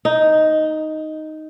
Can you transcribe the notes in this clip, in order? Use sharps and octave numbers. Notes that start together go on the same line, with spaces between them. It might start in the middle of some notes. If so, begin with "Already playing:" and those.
D#4